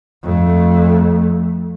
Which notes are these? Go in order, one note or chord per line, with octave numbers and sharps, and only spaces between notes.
F2 A3